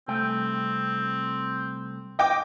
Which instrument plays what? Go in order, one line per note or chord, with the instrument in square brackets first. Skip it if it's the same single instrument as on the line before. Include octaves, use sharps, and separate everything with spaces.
[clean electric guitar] C2 A3 G5 [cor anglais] C4
[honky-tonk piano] D#5 G5 D6